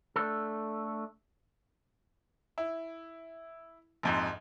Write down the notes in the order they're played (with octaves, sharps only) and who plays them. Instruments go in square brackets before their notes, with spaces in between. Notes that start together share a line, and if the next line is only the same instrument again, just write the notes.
[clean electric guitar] A3 D4 A4
[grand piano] E4
A#1 F2 G#2